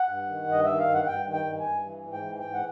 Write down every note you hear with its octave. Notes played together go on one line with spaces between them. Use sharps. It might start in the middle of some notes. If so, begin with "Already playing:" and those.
Already playing: F#5
G2
D#3
G2 D#5
D#3 E5
F5
G2
F#5
G2 G5
D#3
G5
G2
G#5
G2
E3
G#2
G5
E3
G5
G#2
F#5